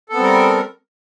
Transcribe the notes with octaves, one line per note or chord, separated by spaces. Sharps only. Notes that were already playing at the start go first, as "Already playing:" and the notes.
G3 B3 C4 A4 A#4